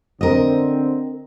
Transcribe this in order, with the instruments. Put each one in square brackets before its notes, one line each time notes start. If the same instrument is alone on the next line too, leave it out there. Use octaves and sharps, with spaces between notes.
[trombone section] D3 C4 [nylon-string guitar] A#4 D#5